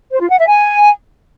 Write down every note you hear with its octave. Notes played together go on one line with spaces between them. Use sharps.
C5
F4
F#5
E5
G#5